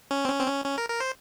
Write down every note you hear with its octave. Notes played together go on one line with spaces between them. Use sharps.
C#4
C4
C#4
C4
C#4
C#4
A#4
A#4
C5